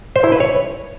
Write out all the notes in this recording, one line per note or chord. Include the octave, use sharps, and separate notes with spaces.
C5
E4
B4
C#5